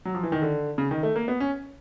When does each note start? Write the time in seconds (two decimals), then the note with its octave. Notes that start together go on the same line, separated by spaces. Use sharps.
0.05 F#3
0.15 F3
0.23 E3
0.32 D#3
0.42 D3
0.78 C#3
0.91 D#3
1.03 A3
1.16 A#3
1.28 B3
1.40 C#4